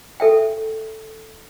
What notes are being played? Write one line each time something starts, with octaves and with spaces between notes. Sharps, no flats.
A4 E5 G5